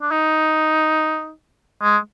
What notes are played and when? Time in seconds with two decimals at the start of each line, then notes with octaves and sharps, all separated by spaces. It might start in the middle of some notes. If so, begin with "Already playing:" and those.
0.02 D4
0.11 D#4
1.82 G#3